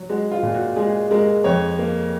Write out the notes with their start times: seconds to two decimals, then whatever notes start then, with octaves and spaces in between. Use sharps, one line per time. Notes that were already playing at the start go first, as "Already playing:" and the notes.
Already playing: F#3
0.09 G#3 F#4
0.31 F4
0.43 A#2
0.54 F#4
0.76 G#3 G#4
1.11 G#3 A#4
1.44 F2 C#5
1.79 A#3